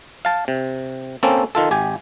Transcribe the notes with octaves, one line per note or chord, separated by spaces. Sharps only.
F5 A5
C3
A#3 C4 C#4 A4
D#3 F4 A4
G#1 G4 G#5